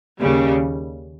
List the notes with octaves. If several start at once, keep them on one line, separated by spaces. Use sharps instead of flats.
D#2 C#3 G3